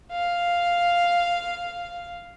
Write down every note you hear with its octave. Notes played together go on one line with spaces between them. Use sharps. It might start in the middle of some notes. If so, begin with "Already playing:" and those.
F5